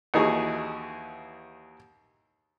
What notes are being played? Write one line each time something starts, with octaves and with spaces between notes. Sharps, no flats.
D#2 E3 D#4 F#4 G#4